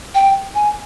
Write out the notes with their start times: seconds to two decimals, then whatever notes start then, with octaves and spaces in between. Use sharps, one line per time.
0.15 G5
0.55 G#5